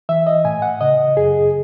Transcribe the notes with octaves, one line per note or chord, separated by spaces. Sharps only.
E3 E5
D#5
A2 G#5
F#5
C#3 D#5
F#2 G#4